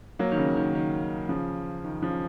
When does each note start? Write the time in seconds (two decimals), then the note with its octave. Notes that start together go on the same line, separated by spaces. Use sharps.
0.19 F#3 A#3
0.31 D#3
0.38 C#3
0.56 D#3
0.75 D#3
1.29 C#3 F3
1.84 D#3
2.02 C#3 F3